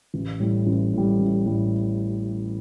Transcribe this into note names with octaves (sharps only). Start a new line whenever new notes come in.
A1
A2 G3
A1
A2 G3
A1
A2 G3